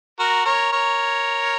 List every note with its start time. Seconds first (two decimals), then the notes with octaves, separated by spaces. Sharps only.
0.19 F#4 A#4
0.45 A#4 C#5
0.73 A#4 C#5